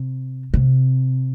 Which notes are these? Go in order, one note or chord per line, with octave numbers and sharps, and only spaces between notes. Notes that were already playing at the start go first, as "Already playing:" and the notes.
Already playing: C3
C3